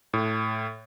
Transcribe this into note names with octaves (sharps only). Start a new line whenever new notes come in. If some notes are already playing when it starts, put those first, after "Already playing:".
A2